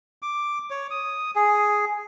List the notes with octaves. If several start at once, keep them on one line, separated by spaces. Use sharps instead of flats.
D6
C#5
D#6
G#4